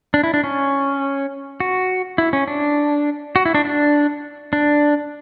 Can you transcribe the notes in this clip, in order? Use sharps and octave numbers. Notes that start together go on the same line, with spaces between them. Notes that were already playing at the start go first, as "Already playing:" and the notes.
D4
E4
D4
C#4
F#4
E4
C#4
D4
F#4
E4
D4
D4
D4